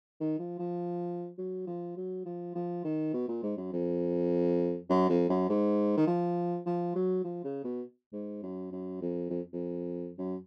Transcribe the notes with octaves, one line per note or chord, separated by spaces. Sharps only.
D#3
F3
F3
F#3
F3
F#3
F3
F3
D#3
B2
A#2
G#2
F#2
F2
F#2
F2
F#2
G#2
D#3
F3
F3
F#3
F3
C#3
B2
G#2
F#2
F#2
F2
F2
F2
F#2